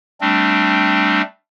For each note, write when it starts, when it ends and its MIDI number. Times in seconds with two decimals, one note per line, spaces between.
0.21 1.22 55
0.21 1.22 57
0.21 1.22 60
0.21 1.22 62